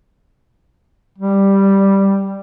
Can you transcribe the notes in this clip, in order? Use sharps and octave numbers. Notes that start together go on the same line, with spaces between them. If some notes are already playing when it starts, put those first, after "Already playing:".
G3